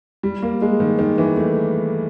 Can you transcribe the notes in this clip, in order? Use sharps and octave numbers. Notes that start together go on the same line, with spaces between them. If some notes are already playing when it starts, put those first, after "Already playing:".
G3
A#3
G#3
D#3
D#3
E3
A3